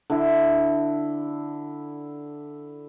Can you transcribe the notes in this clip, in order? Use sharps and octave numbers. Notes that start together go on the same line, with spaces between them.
D3 E4